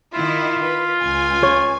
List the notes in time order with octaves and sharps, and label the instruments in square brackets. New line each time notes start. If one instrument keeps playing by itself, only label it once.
[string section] D#3 E4 [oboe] F4
[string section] B4
C#2 G#5
[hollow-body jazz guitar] C#5